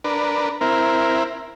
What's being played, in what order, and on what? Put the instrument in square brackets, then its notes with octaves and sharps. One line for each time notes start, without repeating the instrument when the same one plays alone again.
[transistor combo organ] D4 A#4 B4
[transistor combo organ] C4 E4 [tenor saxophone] A#4